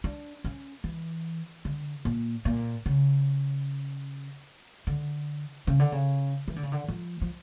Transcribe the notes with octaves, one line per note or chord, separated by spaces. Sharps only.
D4
C#4
E3
D3
A#2
A#2
C#3
D3
C#3
D3
C#3
E3
D3
C#3
D3
F3
F3